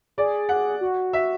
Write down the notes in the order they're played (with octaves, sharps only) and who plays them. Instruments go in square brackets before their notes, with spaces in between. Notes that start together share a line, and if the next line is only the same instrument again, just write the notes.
[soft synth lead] G#4 [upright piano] D5
[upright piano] F#5
[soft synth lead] F#4
[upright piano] E5